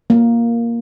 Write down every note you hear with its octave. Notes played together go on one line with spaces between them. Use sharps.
A#3